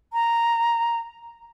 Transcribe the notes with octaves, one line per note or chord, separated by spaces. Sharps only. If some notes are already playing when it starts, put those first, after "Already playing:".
A#5